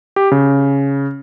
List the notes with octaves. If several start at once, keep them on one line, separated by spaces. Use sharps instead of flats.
G4
C#3